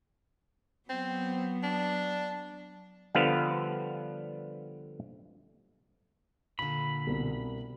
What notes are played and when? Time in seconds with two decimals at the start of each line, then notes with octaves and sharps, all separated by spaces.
0.89 F#3 B3 C4
1.63 D4
3.15 D3 F3 G3 B3 B4 F5
6.59 A#2 D3 B5
7.07 C2 B2